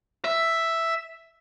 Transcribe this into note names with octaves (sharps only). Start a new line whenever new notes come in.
E5